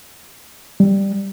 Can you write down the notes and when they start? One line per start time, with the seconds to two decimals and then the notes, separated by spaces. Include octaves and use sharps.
0.80 G3